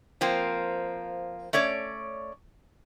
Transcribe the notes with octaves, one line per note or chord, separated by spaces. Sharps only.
F3 A#3 C4
A3 C#4 C#5 D5